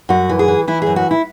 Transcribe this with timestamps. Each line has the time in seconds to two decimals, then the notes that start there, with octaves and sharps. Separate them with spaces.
0.09 F#2 F#4
0.29 E3
0.39 G#4
0.48 E3
0.67 E3 E4
0.82 F#2 G#4
0.96 F#4
1.11 E4